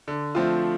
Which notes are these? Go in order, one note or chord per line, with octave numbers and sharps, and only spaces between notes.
D3
F3 A3 C4 F4